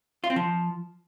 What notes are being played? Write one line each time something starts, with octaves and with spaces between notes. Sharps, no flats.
F4
C4
F3